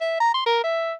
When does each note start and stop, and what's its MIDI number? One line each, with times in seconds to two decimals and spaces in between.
0.01 0.18 76
0.20 0.33 82
0.34 0.43 84
0.46 0.62 70
0.64 0.94 76